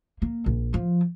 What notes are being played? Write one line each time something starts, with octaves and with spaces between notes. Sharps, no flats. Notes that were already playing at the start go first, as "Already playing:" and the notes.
A#3
A#1
F3